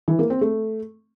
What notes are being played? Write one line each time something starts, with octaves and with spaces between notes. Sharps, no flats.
E3
A#3
C4
A3